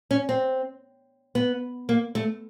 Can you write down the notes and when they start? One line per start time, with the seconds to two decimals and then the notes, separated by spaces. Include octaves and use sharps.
0.11 C#4
0.29 C4
1.35 B3
1.89 A#3
2.15 A3